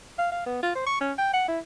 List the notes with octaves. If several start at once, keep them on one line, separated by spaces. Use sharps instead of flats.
F5
F5
B3
F4
C5
C#6
C#4
G5
F#5
E4